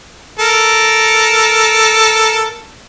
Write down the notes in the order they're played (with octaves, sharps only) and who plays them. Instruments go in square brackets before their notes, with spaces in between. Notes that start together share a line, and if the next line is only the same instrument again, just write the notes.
[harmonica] A4 A#4